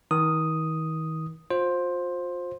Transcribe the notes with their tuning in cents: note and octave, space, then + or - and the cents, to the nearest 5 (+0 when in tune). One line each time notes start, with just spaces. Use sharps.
D#3 +40 D#6 +0
F4 +35 C5 +10